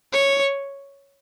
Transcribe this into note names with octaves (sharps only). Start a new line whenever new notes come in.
C#5